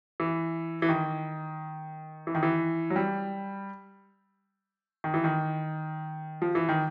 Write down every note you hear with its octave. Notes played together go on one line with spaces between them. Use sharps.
E3
E3
D#3
E3
D#3
E3
F#3
G3
D#3
E3
D#3
F3
E3
D#3